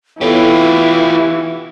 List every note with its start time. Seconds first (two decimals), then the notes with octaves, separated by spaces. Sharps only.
0.21 E3 B3 E4 F4 G4 A4 C#5